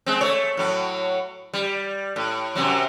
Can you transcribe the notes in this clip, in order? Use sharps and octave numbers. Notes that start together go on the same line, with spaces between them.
G#3 C4
A3 C#5
A2 F#3
G3
A2
F#2 C3 F#3